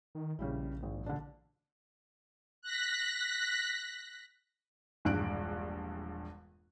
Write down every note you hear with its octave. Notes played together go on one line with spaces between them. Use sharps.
D#3
A#1 C#3 G3 E4
G#1
D3 D4
F#6 A#6 B6
E1 A#1 G2 F#6 D7